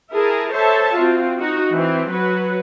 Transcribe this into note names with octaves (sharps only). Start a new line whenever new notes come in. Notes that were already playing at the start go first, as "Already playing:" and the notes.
E4 G#4 A#4 A5
A4 C5 C#5 E5 A5
C4 F4 F#4
D#4 F#4
E3 C4
F#3 F#4 B4